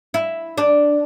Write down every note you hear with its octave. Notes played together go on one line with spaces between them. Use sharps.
E4
D4